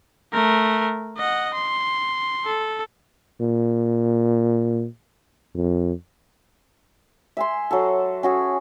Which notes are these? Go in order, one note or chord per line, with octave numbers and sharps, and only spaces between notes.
A3 A#4
D#5 F#5
C6
A4
A#2
F2
E5 G#5 C6
F#3 A4
C#4 F#4 G#4